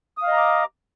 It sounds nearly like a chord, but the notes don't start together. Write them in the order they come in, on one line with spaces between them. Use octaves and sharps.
D#6 F5 D#5 A#5 D6